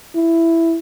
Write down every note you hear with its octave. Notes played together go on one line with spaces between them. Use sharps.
E4